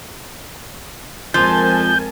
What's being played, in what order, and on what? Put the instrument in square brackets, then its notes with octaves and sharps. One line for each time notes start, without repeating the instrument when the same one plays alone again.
[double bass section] F2 G#3 C4 [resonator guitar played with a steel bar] F3 [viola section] A#4 G#5 A5 [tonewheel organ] G6